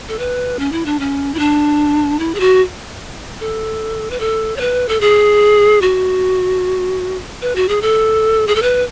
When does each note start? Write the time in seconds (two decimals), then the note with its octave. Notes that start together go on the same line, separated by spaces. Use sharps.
0.09 A4
0.19 B4
0.59 C#4
0.72 E4
0.86 D4
1.00 C#4
1.34 E4
1.39 D4
2.19 E4
2.35 G#4
2.40 F#4
3.40 A4
4.11 B4
4.20 A4
4.56 C#5
4.61 B4
4.89 A4
5.01 G#4
5.82 F#4
7.42 B4
7.56 F#4
7.69 G#4
7.82 A4
8.48 G#4
8.55 A4
8.62 B4